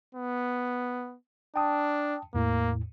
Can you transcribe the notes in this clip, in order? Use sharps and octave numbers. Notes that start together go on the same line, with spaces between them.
B3
D4 G5 A5 D#6
E2 A2 A#3